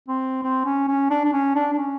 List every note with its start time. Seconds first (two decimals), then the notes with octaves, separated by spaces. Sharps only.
0.09 C4
0.43 C4
0.65 C#4
0.88 C#4
1.10 D4
1.25 D4
1.33 C#4
1.55 D4
1.73 D4
1.78 C#4